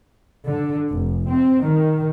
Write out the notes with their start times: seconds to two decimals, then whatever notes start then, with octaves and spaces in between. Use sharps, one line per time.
0.47 D3
0.91 F1
1.29 C4
1.63 D#3